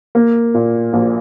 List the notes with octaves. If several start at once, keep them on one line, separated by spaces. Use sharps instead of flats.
A#3
A#2
A#1